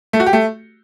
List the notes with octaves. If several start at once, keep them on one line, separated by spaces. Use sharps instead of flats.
A3
F#4
G4
A3